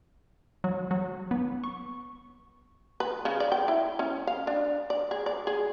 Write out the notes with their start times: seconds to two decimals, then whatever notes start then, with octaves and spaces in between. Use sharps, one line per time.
0.64 F#3
0.91 F#3
1.31 B3
1.64 C#6
3.00 B4
3.25 C#3
3.40 D5
3.52 G5
3.68 E4
3.99 C#4
4.27 F5
4.47 D4
4.90 D5
5.11 G#4
5.26 D5
5.47 G#4